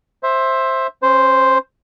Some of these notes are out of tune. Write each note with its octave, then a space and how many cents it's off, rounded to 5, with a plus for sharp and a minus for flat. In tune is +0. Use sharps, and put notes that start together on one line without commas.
C5 +15 E5 +0
C#4 -35 C5 +0